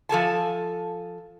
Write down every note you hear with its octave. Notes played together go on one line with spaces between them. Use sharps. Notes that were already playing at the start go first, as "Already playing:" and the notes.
F3 A4 G#5 A5